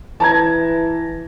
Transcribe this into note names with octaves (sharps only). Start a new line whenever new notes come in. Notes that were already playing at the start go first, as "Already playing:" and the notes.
E3 A5 A#5 G#6